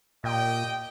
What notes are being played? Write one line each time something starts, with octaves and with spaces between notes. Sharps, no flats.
A#2 G4 D#5 G5